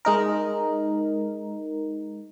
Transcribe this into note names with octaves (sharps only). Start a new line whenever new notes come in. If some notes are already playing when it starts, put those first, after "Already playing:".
G#3 D#4 A#4